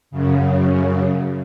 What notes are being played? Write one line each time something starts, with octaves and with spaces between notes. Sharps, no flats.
F#2 C#3